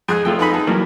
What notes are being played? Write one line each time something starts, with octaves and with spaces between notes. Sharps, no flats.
F2 G#2 G#4 F#6
F2 A3 F4 G5
B3 D#4 G#4 B5
B3 G#4 A4
G2 E3 F#3 A#3